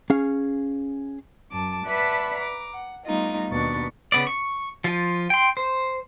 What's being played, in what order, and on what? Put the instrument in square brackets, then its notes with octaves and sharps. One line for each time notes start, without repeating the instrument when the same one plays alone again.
[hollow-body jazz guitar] C#4 G#4 F5
[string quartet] F#2 A5 D6
B4 D5 E5 F#5 A5 B5
A#5 D6
F#5
G3 A3 B3 D#4 F4
D#2 B2 B3 D4 C#6 A6
[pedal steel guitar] C#3 B3 D5
C#6
F3 F4
G5 C6
C5